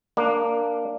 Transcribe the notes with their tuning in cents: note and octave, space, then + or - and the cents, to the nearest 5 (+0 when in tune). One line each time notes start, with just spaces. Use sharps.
A#3 -5 D4 +0